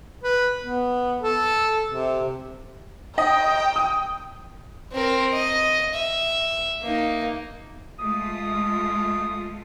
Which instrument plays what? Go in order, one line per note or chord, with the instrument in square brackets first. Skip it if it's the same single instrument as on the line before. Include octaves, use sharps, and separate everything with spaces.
[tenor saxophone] B4
B3
A4
C3
[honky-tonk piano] D#5 [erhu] G5
[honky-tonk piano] D#6
[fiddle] C4 A#4
D#5
E5
A#3 D#4
[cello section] G#3 A3 F4 [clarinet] D#6